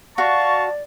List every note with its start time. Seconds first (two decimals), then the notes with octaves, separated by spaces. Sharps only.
0.18 F#4 D5 F5 A5 C#6